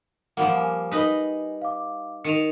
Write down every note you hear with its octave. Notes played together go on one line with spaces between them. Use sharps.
F3 G3 A#3 F#5
G#5
D#4 B4 D#5
F5 D6
D#3 C#7 D#7 F7